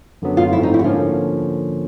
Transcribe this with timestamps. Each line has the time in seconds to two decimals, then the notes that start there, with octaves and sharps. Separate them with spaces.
0.22 F#2 D3 F#3 B3
0.37 F4
0.53 G#2 F3 A3 C4 E4
0.63 D#4
0.74 E4
0.79 F#4
0.84 D3 F3 A#3 C#4 F4